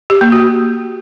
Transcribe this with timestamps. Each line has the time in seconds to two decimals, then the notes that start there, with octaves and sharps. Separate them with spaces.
0.10 G4
0.21 A#3
0.32 F#4